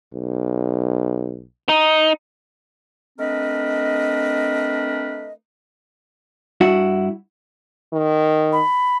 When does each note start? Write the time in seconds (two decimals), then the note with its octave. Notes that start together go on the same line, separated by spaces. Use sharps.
0.14 B1
1.69 D#4
3.19 A3 C4 D4 A#4 B4 D#5
6.61 G2 E4 F#4
7.93 D#3
8.52 B5